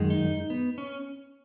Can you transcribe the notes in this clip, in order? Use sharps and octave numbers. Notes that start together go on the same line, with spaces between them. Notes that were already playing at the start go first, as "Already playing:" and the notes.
Already playing: F#2 D#3 G#3
D#4
B3
C#4